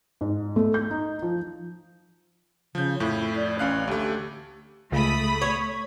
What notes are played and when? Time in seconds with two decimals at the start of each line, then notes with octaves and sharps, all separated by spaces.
0.21 G#2
0.56 A3
0.74 G6
0.91 D#4
1.22 F3
2.75 C#3 F3 G6
3.00 F2 A2 E4
3.36 D5
3.59 A1 C#4 F5 F#6
3.88 D2 A3 G4
4.92 C#2 C#3 A3 B5 D#6
5.42 C#5